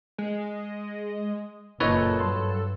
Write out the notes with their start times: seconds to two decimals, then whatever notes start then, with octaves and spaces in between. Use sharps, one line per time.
0.18 G#3
1.80 F#1 A#2 A4 B4 C#5 D#5 C#6
2.20 G2 F#3 C6